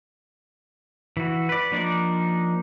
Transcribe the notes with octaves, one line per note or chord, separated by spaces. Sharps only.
E3 F#4
B4 D5
F3 A#3 D4 D#4 D5